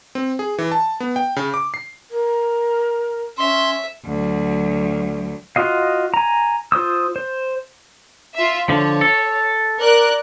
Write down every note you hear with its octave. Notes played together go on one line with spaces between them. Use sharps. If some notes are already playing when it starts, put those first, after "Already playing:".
C4
G#4
E3
A5
B3
G5
C#3
D6
C7
A#4
C#4 E5 C6
D2 F#3
F4 F#4 D#5 F5
G#5 A#5
F4 C5 D#6 E6
C5
F4 E5
D3 F3 C#5
A4
A#4 D5 F#6